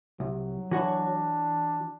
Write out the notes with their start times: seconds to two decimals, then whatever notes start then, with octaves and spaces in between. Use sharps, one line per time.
0.20 C2 F#3
0.71 E3 D4 F#4 C#5